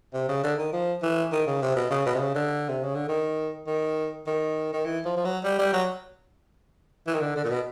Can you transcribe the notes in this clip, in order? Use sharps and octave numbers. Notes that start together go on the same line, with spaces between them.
C3
C#3
D3
D#3
F3
E3
D#3
C#3
C3
B2
C#3
B2
C3
C#3
D3
C3
C#3
D3
D#3
D#3
D#3
D#3
E3
F3
F3
F#3
G3
G3
F#3
E3
D#3
D3
D3
A#2
B2